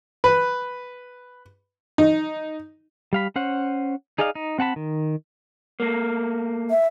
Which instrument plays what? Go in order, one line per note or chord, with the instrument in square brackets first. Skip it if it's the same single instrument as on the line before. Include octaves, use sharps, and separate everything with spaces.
[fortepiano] B4
D#4
[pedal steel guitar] G3 F5 B5
C#4 C5 F#5
D#4 G#4 D5 D#5 F5
D#4
C4 F#5 A5 B5
D#3
[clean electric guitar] A3 A#3
[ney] E5